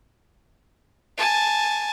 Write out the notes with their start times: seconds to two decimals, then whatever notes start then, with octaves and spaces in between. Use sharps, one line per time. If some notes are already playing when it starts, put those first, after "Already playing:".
1.17 G#5 A5